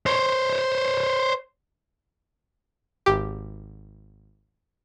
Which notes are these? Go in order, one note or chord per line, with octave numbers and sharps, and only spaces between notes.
C5 C#5
G#1 G4